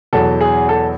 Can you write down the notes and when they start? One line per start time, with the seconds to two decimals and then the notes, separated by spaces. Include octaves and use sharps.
0.13 E2 B2 F#3 A4
0.41 G#4
0.69 A4